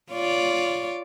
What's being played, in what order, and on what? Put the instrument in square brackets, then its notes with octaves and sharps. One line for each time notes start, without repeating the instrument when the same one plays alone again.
[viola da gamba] F4 C#5 D5